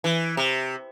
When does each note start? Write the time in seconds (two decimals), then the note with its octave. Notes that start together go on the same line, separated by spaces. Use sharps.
0.04 E3
0.37 C3